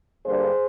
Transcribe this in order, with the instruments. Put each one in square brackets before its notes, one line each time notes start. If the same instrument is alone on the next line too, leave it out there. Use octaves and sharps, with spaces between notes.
[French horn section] G2 D3 G3 A#3 G#4 C5